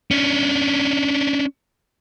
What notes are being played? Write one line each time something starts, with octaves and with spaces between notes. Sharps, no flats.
C#4 D4